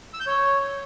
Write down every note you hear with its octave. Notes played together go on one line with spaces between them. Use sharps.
E6
G6
C#5